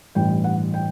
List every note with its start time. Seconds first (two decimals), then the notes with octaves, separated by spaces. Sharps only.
0.15 A1 G2 E3 G5
0.44 F#5
0.74 G5